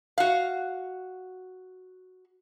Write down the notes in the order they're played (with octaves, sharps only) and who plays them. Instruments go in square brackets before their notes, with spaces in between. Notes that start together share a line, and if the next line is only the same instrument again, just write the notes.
[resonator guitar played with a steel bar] F#4 F5